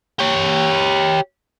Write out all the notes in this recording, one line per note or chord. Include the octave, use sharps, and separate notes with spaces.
G4 C#5